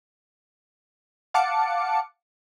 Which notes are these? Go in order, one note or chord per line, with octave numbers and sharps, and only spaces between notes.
F5 F#5 A5 D6 C#7